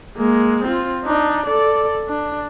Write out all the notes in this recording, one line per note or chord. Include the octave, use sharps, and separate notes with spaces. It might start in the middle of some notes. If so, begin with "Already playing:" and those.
G#3 A#3
C4 F4
D4 D#4
A4 D5
D4